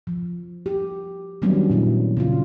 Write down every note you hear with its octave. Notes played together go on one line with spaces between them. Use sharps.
F3
G4
D#3 F#3 G3 B3 C#4 D4
A#2 F#3 E4
C#3 D4 F4